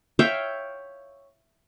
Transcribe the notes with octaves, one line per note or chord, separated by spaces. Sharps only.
C#5 E5 F5 G5